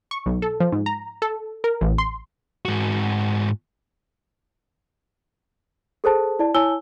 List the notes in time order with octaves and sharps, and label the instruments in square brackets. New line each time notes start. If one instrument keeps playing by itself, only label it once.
[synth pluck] C#6
B1
A4
F3
G#2
A#5
A4
A#4
A1
C6
[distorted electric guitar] G#2 F#4
[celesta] G#4 A4 C5 A5
E4 D5 A5
E4 C#5 G#5 A5 E6 G7